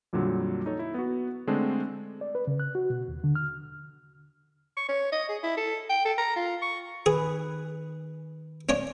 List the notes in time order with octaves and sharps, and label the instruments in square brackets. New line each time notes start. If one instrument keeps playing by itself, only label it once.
[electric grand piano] F2 A#2 D3 F#3 G3
D#4 A4 C#5
E4
B3 F#4
D3 G#3 A3 C4 D4
[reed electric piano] D5
B4
C#3
F#6
F#4
B2
D#2
D3
F6
[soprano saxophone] C#6
C#5
D#5
G#4
E4
A4
G5
A4
A#5
F4
C#6
[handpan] D#3 B4 [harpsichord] G#4
[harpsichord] C#4 D4 C#5